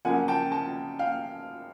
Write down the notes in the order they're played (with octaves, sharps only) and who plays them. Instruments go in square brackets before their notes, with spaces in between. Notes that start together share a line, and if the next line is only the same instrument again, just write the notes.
[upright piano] F#2 C#3 F3 A#3 F#5 G#5
G5 A5
G5 A5
F5 G5